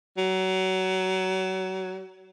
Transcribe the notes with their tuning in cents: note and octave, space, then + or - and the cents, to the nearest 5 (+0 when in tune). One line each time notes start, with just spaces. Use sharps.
F#3 +25